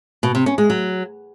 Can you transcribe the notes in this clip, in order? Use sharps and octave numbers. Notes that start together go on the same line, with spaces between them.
B2
C3
C#4
G#3
F#3